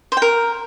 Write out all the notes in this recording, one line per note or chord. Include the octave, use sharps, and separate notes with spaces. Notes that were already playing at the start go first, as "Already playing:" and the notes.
C5
G5
A#4